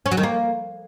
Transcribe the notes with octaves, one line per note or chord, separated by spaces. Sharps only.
C#4
F#3
D#3
A#3